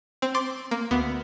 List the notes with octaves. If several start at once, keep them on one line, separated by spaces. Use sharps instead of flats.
C4
C6 D6 A6 C7
A#3
D2 B3